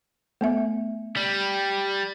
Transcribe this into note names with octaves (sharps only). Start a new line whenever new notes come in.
A3 B3 E5
G3